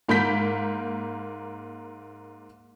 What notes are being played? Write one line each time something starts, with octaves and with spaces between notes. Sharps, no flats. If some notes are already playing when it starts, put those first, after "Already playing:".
G#2 A#3 B5 G6 B6